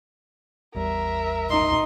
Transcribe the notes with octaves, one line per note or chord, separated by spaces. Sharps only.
A1 E2 G3 A#4 E5
D#4 C6